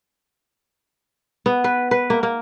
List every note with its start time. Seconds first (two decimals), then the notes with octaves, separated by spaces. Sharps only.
1.46 B3
1.64 B4
1.91 B4
2.10 A#3
2.23 A#3